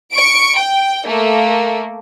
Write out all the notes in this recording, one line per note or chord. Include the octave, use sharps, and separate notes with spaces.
C#6 D7
G5
A3 A#3